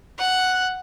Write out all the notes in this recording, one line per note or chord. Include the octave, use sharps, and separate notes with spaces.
F#5 F#6